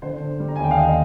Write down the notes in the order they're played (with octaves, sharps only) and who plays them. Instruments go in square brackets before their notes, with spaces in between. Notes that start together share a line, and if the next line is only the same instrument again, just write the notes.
[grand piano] D3 C5
D3
G3
A#5
G#5
D#2 G5
F5
D#2 D#5